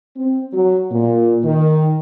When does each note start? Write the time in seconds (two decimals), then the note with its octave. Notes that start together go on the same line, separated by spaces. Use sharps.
0.17 C4
0.53 F#3
0.91 A#2
1.44 D#3